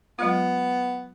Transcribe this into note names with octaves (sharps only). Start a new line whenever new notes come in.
F#3 G#3 B3 F4